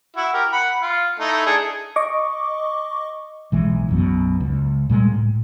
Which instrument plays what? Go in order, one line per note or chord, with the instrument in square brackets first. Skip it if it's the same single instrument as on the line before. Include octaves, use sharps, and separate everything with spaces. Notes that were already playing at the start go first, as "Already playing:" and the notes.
[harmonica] E4 F#4
G4 A#4
F#5 B5
F4
A3 D#4 E4
D4 G#4 A4
[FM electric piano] D#5 C#6 D6
[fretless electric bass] B1 E3 G#3
B1 F#2 B2
C#2
A#2 G3 G#3
A2